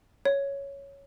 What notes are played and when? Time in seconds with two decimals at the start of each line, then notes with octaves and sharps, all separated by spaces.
0.25 C#5